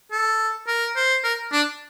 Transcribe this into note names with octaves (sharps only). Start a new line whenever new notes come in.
A4
A#4
C5
A#4
D4